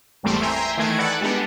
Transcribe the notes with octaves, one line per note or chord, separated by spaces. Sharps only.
G#1 E2 G3 A3 C4 D7
E5 G5 G#5 A#5 C6
D#3 E3 A3 G#6 D7
A4 B4 D5 F#5
G3 G#3 B3 D4